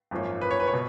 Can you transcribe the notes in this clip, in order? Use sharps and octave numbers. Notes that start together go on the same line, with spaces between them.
G#1 F#2 F3 A#3 C#4
B4
C#5
B4
C#5
B2